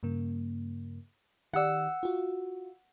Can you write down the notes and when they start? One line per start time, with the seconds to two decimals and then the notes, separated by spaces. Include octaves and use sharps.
0.03 G2 C#3 A#3
1.53 D#3 G4 D5 F#5 E6
2.03 F4 F#4